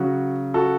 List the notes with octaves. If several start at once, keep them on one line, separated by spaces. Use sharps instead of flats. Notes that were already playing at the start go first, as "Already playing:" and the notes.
Already playing: C#3 F#3 F#4
F#4 A4